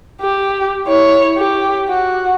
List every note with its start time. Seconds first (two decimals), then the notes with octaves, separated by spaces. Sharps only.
0.21 G4
0.87 E4 C#5
1.37 G4
1.88 F#4